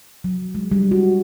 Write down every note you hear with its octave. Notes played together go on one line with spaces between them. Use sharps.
F#3
G#3
G3
F#4